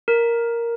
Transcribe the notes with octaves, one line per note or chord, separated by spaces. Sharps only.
A#4